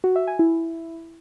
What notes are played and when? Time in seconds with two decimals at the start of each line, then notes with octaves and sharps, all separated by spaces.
0.04 F#4
0.16 E5
0.27 G#5
0.39 E4